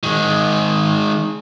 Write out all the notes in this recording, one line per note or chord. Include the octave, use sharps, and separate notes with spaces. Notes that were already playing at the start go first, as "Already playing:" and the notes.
D#3 G#3